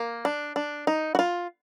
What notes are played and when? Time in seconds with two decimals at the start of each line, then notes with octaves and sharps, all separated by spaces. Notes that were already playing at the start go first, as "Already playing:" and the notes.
Already playing: A#3
0.25 D4
0.56 D4
0.87 D#4
1.15 F#4
1.19 F4